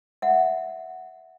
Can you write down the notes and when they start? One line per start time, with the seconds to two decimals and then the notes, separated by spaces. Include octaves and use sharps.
0.22 E5 F#5